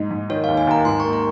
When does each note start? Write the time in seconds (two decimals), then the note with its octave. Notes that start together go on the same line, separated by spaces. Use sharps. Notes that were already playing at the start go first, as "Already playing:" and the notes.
Already playing: G#2 D#4
0.11 G#2
0.30 D#3 C#5
0.44 F5
0.48 D#2
0.57 G#5
0.67 D#2 A#5
0.85 G#1 C6
1.00 C#6
1.04 A#3
1.13 A#5